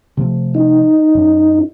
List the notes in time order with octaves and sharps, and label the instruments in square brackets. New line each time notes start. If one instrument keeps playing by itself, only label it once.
[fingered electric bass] C3 F3 A3
[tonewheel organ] D#4
[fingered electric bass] F#2